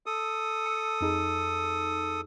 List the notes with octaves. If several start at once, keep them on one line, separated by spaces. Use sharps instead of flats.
A4 D#6
A5 E6 C#7
F2 D#4 G#4